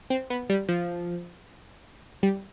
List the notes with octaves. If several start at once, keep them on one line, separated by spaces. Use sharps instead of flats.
C4
B3
G3
F3
G3